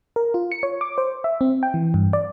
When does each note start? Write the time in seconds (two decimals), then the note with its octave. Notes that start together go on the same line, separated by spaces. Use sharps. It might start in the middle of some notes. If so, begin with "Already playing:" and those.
0.16 A#4
0.34 F4
0.52 C#7
0.63 C#5
0.81 D6
0.98 C5
1.24 E5
1.41 C4
1.63 G5
1.74 E3
1.94 G2
2.13 D5